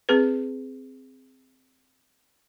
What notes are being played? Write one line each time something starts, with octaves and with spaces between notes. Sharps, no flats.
C4 G#4 B4